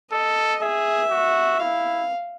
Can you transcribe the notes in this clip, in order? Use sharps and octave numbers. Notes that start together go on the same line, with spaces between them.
A4 D#5
G#4 E5
F#4
E4 F5